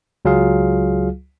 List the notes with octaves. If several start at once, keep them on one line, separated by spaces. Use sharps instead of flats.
C#2 F#3 F4 G#4 F5